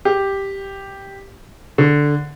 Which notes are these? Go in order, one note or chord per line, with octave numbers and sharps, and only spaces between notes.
G4
D3